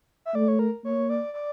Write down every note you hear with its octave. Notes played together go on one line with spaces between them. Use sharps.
E5
A3 D5
C#5
A#4
A#3 C#5
D5
D5